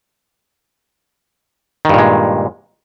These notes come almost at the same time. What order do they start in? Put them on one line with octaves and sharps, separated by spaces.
D#3 G2 A#2 G#3